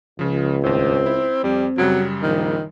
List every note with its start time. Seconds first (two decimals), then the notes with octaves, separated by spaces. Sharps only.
0.19 C#2 C#3 F3
0.64 D#2 A2 C4
1.06 E4
1.44 F2 G3 C4
1.78 F#2 C#3 F#3 G3
2.23 A#1 D#3